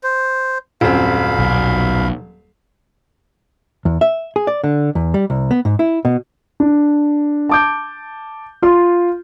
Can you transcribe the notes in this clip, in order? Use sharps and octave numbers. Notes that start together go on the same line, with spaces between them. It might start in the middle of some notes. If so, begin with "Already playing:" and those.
C5
D#1 F#2 C4 F5 B5
B1
E2
E5
G#4
D5
D3
E2
G3
C2
B3
G#2
E4
B2
D4
A5 D6 G6
F4 C6